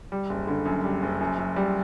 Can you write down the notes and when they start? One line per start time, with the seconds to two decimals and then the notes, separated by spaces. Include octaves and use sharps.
0.12 G3
0.30 F#1
0.47 D3
0.65 F#2
0.84 G3
1.02 F#1
1.21 F#2
1.38 F#2
1.56 G3